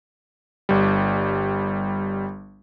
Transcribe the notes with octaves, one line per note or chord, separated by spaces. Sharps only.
G1 G3